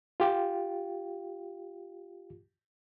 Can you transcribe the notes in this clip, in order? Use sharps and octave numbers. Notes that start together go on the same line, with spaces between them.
F4 G4